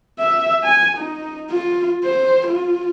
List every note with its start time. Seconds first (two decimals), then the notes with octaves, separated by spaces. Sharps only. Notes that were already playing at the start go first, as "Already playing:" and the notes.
0.19 E5
0.64 G#5
0.98 D#4
1.51 F4
2.04 C5
2.47 F4